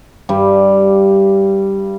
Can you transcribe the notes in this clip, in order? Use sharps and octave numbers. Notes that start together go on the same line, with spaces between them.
G2 G3